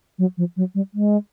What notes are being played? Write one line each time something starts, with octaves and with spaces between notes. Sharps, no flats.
F#3
F3
F#3
G3
G#3